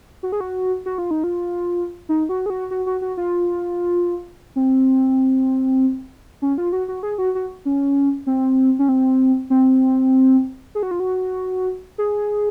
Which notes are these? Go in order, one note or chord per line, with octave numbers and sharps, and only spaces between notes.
F#4
G#4
F#4
F#4
F4
D#4
F4
D#4
F#4
G#4
F#4
F#4
F#4
F#4
F4
C4
C#4
F4
F#4
F#4
G#4
F#4
F#4
C#4
C4
C#4
C4
C4
G#4
F#4
F4
F#4
G#4